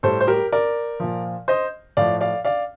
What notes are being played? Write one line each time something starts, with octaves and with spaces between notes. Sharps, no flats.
A2 G3 A4 C5
C5
G4 A#4
A#4 D5
A#2 F3
C5 D#5
A2 F3 D5 F5
D5 F5
D5 F5